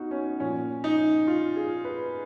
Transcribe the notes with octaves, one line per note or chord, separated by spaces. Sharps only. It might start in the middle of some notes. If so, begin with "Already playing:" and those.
Already playing: B2 D#4 F#4
C#4
A#2 F3 C#4
D#4
F4
G#4
B4